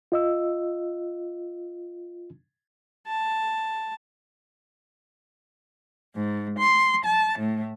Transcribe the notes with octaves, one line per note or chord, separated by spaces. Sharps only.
F4 D#5 E6
A5
G#2
C6
A5
A2